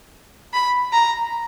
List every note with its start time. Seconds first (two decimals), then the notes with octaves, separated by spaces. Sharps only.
0.53 B5
0.93 A#5